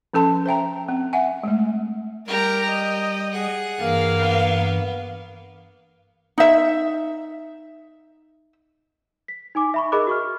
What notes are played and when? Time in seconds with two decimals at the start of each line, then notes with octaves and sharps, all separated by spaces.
0.14 F3 C#4 A4 A5 C6
0.46 C5 E5 G5 A#5
0.88 C4
1.13 E5 F#5 G#5
1.43 G#3 A3
2.28 G3 G4 A#4 A#5
2.69 D#5
3.32 G#4 F#5
3.80 G2 E3 A#3 F5
4.18 B3
6.38 D#4 E5
9.28 B6
9.55 D#4 G#5 D6
9.74 E5 B5 C#6
9.92 G#4 A#4 D#5 B5 D6 F#6
10.07 F#4 C#6 F6